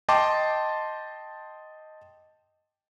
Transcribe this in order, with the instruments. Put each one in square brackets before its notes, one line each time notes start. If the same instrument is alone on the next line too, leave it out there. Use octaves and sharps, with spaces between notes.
[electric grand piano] D#5 G5 A5 C6 D6